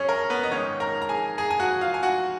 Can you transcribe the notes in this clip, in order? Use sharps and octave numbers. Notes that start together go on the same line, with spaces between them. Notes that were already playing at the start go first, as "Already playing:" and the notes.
Already playing: F#2 C#4 G#4 C#5
A#4
B3 B4
D#5
G#2 D#3 G#3 C#4 C#5
A#4 A#5
A#5
G#4 G#5
G#4 G#5
G#5
F#4 F#5
F4 F5
G#5
F#4 F#5